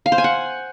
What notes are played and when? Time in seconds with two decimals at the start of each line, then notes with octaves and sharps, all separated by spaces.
0.06 F5
0.12 C5
0.18 G#5
0.24 F#5